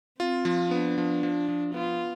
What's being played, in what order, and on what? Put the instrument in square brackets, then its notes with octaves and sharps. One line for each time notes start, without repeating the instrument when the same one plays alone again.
[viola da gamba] C4 [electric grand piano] F4
[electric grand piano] F3
[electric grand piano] B3 [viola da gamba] D4
[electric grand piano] F3
F3
F3
[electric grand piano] B3 [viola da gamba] F4